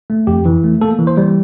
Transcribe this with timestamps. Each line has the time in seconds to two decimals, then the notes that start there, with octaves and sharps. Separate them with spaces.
0.10 A3
0.27 F2 G4
0.45 E3
0.64 A3
0.81 A#3 A4
0.99 E3
1.07 C5
1.17 G3